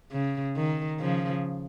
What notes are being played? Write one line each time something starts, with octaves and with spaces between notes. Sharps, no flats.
C#3
D#3
C#3 F3